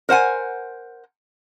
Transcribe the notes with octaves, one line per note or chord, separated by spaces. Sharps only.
A#4 C5 F#5 G#5